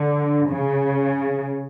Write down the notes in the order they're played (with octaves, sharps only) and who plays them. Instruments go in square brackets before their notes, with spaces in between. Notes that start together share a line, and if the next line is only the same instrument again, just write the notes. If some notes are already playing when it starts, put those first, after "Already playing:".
Already playing: [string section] D3
C#3